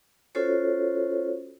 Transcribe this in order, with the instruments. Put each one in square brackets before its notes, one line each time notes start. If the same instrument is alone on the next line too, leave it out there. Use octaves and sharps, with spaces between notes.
[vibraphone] C#4 F4 F#4 A4 C5 C#5